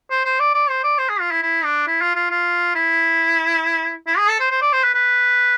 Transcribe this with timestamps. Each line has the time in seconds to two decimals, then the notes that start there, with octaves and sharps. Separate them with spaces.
0.10 C5
0.25 C5
0.40 D5
0.54 D5
0.69 C5
0.83 D5
0.98 C5
1.09 G#4
1.20 F4
1.31 E4
1.43 E4
1.64 D4
1.87 E4
2.01 F4
2.15 F4
2.30 F4
2.75 E4
4.07 E4
4.18 G#4
4.29 A4
4.40 C5
4.50 C5
4.61 D5
4.73 C5
4.83 B4
4.94 B4